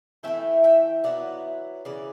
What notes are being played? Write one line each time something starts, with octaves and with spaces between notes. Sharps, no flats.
E3 A3 C#4 E4 E5 G5
E5 G5
F#3 B3 E4 D5 F#5
C#3 E3 D5